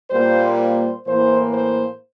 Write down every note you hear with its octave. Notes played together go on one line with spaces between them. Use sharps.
A#2 G3 A#3 C5
C5
A2 E3 A#3 C5
C5